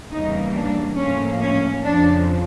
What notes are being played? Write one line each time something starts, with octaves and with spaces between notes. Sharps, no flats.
E2 C#3 E3 G3 A#3 D#4
D4
A2 F3 A#3 C#4
C#4
F2 C#3 F3 D4